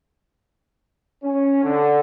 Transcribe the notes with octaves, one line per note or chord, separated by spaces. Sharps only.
C#4
D3